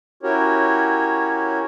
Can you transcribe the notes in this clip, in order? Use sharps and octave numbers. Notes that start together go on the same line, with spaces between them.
C#4 E4 F#4 G4 A#4 C#5